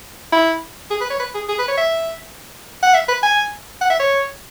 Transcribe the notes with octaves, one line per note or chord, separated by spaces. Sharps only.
E4
G#4
B4
C#5
B4
G#4
G#4
B4
C#5
E5
F#5
E5
B4
G#5
F#5
E5
C#5